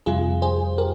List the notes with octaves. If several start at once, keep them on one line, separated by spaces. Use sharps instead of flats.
F2 C3 G3 F4 G#4
G#4 C5
G4 A#4